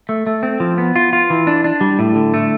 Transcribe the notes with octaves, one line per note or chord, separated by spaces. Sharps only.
A3
A3
C4
F3
B3
F4
F4
E3
D4
D4
G3
A2
D3
A3